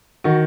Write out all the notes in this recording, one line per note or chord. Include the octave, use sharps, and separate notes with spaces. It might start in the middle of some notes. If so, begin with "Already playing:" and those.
D#3 F#4